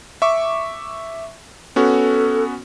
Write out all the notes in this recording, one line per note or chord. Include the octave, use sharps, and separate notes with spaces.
E5 C#6 D6
B3 C#4 F#4 A4